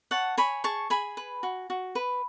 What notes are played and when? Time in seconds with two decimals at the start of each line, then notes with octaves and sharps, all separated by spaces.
0.11 C#5 F#5 A5
0.38 C#5 G#5 B5
0.64 G#4 A5 C#6
0.90 G#4 G#5 B5
1.17 B4
1.43 F#4
1.70 F#4
1.95 B4